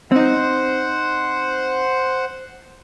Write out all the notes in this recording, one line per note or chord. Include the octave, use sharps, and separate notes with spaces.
C4 D#4 C5 F#5